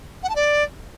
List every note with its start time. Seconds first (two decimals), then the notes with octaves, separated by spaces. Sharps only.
0.23 F#5
0.29 A5
0.35 D5